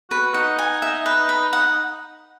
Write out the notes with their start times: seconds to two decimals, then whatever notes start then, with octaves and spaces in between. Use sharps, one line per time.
0.10 F#4 B4
0.34 D#4 F#5
0.59 G#5
0.82 E5
1.06 B4
1.29 B5
1.53 F#5